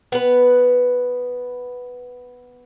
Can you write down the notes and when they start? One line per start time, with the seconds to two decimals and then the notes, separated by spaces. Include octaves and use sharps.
0.12 B3 B4